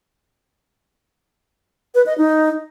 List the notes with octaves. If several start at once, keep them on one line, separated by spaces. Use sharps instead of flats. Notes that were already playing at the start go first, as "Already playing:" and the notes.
B4
D#5
D#4